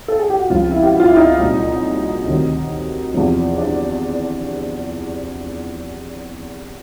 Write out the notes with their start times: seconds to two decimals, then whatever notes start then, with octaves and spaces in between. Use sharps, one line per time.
0.08 A4
0.19 G#4
0.30 G4
0.39 F#4
0.50 C#2 C3 F3 F4
0.72 E4
0.83 G4
0.90 F#4
1.00 F4
1.08 E4
1.16 D#4
1.38 C2 A#2 F#3
2.26 D2 C3 D#3 F#3
3.14 E2 C3 F3
3.58 D4